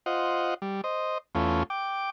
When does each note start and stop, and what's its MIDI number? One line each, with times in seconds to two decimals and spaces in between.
0.06 0.54 65
0.06 0.54 72
0.06 0.54 75
0.06 0.54 78
0.62 0.81 55
0.84 1.18 72
0.84 1.18 75
1.35 1.63 40
1.35 1.63 57
1.35 1.63 61
1.35 1.63 65
1.70 2.10 79
1.70 2.10 86